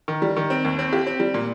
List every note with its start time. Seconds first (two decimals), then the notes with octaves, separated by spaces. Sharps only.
0.08 D#3
0.22 G3
0.37 D#3
0.50 C4
0.65 D#2
0.79 C4
0.93 G4
1.07 C4
1.20 G3
1.34 A#2